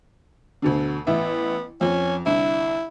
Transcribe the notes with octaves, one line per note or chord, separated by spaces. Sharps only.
D2 B2 D3
A1 B3 E5
F2 C#4
C2 D3 E4